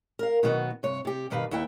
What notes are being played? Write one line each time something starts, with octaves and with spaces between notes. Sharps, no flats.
A#4 F5
B2 D#3 F#3 B3 F#4
G2 C3 C#5
C3 G4
G2 B2 D#3 B4 F5
D#2 B3 E4 E5 G5